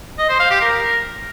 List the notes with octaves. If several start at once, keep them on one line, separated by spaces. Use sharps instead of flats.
D#5
C5
F5
G4
A#4